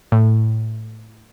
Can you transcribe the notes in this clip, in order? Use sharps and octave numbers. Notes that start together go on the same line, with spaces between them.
A2